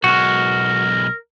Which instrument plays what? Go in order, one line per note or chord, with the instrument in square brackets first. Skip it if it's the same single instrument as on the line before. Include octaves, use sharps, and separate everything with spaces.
[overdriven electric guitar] B1 G#3 [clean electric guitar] F#4 [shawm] A#4